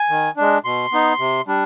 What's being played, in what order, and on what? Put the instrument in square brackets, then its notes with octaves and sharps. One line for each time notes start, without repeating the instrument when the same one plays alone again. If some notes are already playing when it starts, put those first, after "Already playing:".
Already playing: [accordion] G#5
D#3
G#3 D4
B2 C6
B3 D#4
C3
G3 D4